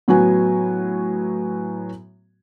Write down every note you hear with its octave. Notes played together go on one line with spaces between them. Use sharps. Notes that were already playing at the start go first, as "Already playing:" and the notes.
A2 F#3 B3 F#4 G#5